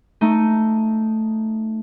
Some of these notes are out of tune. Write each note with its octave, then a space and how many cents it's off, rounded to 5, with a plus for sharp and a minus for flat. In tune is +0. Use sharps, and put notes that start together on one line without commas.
A3 +0 D#4 +0